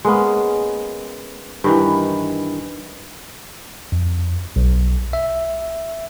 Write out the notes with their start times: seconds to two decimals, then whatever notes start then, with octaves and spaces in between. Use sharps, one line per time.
0.05 G#3 A#3 B3 C#4
1.64 G2 D#3 E3
3.92 F2
4.56 B1
5.13 E5